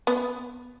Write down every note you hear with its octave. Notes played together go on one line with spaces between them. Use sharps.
B3